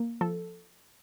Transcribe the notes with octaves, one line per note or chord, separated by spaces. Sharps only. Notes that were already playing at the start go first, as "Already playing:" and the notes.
Already playing: A#3
F3 A4